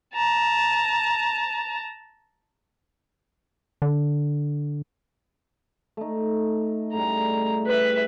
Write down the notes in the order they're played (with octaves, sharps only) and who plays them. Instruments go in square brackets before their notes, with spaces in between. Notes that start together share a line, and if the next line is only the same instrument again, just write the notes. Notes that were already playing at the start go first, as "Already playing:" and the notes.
[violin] A5 A#5
[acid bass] D3
[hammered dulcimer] A3 D#4
[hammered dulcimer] A2 C#3 G3 [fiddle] A#5
[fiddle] B4 E5